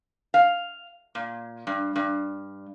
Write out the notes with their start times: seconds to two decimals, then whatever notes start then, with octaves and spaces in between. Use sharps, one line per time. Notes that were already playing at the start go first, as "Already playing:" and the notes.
0.34 F5
1.15 A#2
1.67 G2
1.96 G2